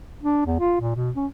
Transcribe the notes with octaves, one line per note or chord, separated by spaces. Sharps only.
D4
E2
F4
A#2
B2
C#4